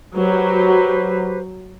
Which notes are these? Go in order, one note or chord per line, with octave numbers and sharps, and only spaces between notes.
F#3 G4 B4 C5